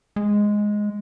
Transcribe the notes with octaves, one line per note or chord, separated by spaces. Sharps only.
G#3